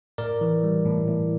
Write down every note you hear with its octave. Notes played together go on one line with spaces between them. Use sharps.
A2 A#4 D5
E3
G3
A2
A2